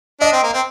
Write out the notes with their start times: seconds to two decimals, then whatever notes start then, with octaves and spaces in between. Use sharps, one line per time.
0.21 D4 D#5
0.33 C4
0.43 A#3
0.53 C4